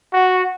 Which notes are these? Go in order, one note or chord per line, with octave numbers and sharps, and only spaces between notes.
F#4